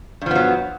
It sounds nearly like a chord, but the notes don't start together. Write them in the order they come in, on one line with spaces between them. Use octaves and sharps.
G2 F3 B3 F#3